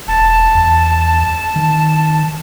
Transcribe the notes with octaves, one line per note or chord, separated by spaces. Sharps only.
E1 A5
E2
D#3